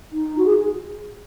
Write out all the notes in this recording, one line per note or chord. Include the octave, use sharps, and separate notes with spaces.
D#4
F#4
G#4